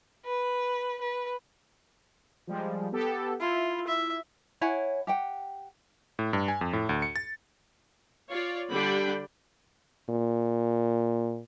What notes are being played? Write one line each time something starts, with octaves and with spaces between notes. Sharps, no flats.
B4
B4
F3 G3 G#3
B3 G4 A4
E4 F4
E5
E4 C#5 F#5 G#5
G4 F#5 G5
A2
G2
G#5
F2
A2
D2
C#7
A6
F4 C#5 D5
D3 G3 D4 G5 B5
A#2